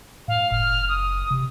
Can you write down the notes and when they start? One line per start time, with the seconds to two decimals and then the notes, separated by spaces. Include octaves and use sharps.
0.28 A2 F5
0.52 F#1 F6
0.89 D#6
1.31 C3